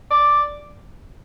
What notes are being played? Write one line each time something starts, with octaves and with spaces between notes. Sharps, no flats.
D5